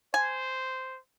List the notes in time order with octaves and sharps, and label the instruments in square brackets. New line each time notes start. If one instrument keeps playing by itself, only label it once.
[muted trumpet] C5 [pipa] G#5